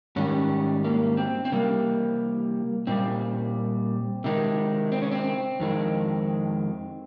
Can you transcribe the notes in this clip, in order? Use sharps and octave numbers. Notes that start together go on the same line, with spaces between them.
G#2 D#3 G3 C#4
A#3
C4
C4
C3 G3 A#3
A#2 G3 C4
C3 D#3 G#3
C4
C#4
C4
F2 D#3 G#3